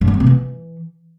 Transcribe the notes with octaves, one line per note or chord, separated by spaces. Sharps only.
F#2
G3
C4
C3
E3